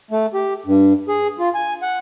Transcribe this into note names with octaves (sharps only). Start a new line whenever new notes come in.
A3
G4
G2
G#4
F4
G#5
F#5